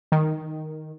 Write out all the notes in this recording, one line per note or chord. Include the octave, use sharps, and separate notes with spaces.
D#3